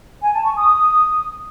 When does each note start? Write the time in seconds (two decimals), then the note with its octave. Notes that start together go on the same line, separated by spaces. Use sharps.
0.22 G#5
0.33 A5
0.44 C#6
0.56 D#6